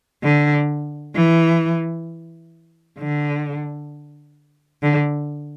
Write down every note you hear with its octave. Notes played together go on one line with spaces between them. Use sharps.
D3
E3
D3
D3